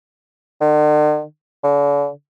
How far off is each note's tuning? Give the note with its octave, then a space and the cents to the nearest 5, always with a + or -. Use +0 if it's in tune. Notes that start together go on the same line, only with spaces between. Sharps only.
D3 +45
D3 -40